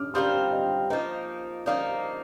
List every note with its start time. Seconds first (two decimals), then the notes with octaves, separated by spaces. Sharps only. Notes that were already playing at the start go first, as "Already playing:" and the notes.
Already playing: D6 D#6 F6
0.14 G3 C4 F4 A#4 C6 D#6
0.52 D#5 G5
0.90 F3 A#3 D#4 C5 D#5
1.66 F3 A#3 D#4 D5 F5